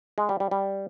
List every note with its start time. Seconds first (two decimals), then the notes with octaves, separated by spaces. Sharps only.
0.18 G#3
0.29 G3
0.40 G3
0.51 G3